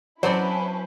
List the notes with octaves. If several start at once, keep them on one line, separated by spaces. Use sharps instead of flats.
F#3 C4 C#4 E4 B4 C5 D5 A5